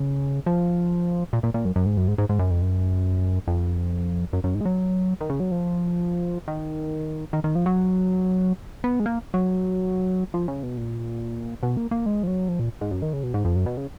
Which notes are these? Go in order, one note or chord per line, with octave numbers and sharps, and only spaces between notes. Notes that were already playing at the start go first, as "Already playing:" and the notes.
Already playing: C#3
F3
A#2
A#2
A#2
F#2
F#2
G#2
F#2
G#2
G#2
G#2
F#2
F2
F#2
F2
F#2
F#2
G#2
G#3
F#3
D#3
C#3
F#3
F3
D#3
D#3
D#3
F3
F#3
B3
G#3
A#3
F#3
F3
C#3
B2
A#2
B2
A#3
A#3
G#3
F3
F#3
F3
A#2
G#2
F#2
D#3
C#3
B2
G#2
F2
F#2
B2
C#3